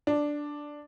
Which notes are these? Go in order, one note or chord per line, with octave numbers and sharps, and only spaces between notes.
D4